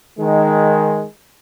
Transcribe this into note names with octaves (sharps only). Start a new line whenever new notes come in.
D#3 G#3